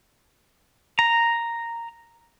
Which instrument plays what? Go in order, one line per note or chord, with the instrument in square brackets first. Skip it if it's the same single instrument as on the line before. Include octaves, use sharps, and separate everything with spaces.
[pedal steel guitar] A#5